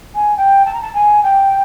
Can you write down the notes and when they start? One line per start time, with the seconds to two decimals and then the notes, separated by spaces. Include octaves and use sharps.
0.15 G#5
0.37 G5
0.65 A5
0.73 A#5
0.81 A5
0.94 G#5
1.23 G5